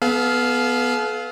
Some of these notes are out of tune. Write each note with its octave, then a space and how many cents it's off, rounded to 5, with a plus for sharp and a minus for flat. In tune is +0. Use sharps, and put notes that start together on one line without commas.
B3 +0 A4 -45 F5 +0